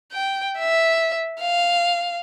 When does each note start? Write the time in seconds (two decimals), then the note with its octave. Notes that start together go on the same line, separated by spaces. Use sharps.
0.13 G5
0.59 E5
1.41 F5